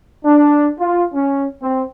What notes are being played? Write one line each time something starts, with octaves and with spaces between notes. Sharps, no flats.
D4
F4
C#4
C4